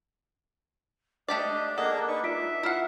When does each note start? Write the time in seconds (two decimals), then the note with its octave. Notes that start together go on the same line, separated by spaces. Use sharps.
1.28 A3 D4 G4 D5 D#5 A5
1.78 A#3 G#4 A4 D#5 F#5 A#5 D#6
2.08 D#4 B4 C#6
2.24 F4 E5 B6 D7
2.63 E4 F4 F#5 F6 C7